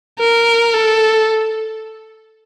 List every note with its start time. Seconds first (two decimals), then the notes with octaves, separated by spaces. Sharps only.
0.19 A#4
0.74 A4